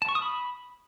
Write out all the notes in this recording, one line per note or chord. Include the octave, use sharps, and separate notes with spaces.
A5
C#6
D#6
B5